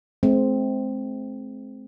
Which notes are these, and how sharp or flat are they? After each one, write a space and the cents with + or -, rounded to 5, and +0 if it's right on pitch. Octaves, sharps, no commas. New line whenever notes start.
G#3 +45 C4 +0